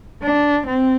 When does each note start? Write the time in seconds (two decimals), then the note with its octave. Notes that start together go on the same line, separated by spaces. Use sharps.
0.23 D4
0.67 C4